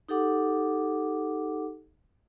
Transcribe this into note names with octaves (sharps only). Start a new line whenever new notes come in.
D#4 G4 A4 F#5 D6